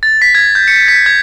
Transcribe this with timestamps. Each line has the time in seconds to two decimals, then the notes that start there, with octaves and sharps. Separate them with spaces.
0.03 A6
0.22 B6
0.35 G#6
0.55 G6
0.68 C#7
0.88 B6
1.06 G#6